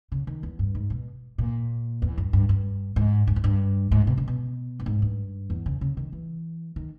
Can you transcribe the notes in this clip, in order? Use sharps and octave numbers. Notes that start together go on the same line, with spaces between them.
C#3
D#3
E2
G2
G#2
B2
A#2
E2
G2
G2
G2
G#2
G2
G#2
G2
G#2
B2
C#3
B2
G2
G#2
G2
E2
C#3
C#3
D#3
E3
D#3